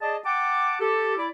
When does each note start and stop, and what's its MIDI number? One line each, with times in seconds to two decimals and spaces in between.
0.01 0.17 68
0.01 0.17 74
0.01 0.17 75
0.01 0.17 81
0.25 0.75 78
0.25 0.75 79
0.25 0.75 81
0.25 0.75 86
0.80 1.17 67
0.80 1.17 69
1.18 1.28 64
1.18 1.28 74